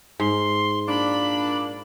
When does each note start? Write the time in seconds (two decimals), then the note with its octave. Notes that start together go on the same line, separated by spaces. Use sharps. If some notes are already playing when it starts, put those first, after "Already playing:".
0.20 G#2 C6
0.88 A#2 A#3 D4 B5